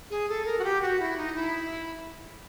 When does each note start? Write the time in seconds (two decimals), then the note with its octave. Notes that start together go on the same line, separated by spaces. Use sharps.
0.10 G#4
0.29 A4
0.46 A#4
0.59 F#4
0.64 G4
0.82 F#4
0.99 E4
1.17 D#4
1.35 E4